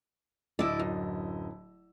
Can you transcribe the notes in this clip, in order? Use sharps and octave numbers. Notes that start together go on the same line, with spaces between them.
D1 E4 D5 D#5 E6
F#2